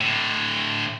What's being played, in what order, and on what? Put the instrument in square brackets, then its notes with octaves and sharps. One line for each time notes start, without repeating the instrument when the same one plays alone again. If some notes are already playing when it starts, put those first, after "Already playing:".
[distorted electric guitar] A2 D3